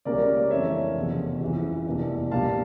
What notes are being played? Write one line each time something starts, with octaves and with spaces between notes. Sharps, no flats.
C#2 C#3 G3 A#3 C#4 A#4 D5
F2 E3 A3 D4 C#5 E5
F1 E2 C#3 F3
G1 F2 C#3 E3
F1 E2 E3 A#3 D4
A#1 A#2 G3 A#3 D4 F5 A5